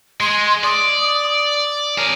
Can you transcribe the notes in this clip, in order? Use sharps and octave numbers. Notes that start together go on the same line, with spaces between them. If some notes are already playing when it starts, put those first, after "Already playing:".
G#3 C6
D5 D#6
G#4 A#4 C#5